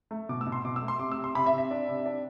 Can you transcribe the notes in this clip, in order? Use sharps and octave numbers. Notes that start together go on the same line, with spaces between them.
A3
B2 D6
E6
B2
C6
B2 D6
E6
A3
C6
C3 D6
E6
C3
C6
C3 B5
E5
C3
E5
D4
C3
D4